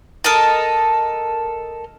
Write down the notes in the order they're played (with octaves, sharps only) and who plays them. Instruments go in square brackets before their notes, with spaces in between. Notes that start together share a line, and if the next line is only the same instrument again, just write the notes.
[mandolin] A4 A#4 D#5 A5